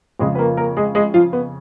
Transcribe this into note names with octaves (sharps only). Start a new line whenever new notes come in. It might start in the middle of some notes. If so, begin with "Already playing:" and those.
F2 C#3 F3 G#3 G#4
B4
A#3 A#4
A#3 A#4
G#3 G#4
G#3 G#4
F3 F4
B3